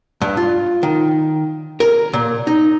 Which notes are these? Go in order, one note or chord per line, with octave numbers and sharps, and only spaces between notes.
G2
F4
D#3
A#4
A#2
D#4